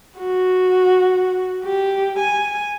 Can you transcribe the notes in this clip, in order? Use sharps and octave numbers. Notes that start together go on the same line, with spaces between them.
F#4
G4
G#5